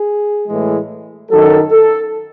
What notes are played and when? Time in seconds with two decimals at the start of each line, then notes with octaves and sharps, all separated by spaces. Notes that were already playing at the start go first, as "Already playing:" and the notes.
Already playing: G#4
0.48 A2 E3 G#3
1.31 F#2 D#3 F#3 A4
1.71 A4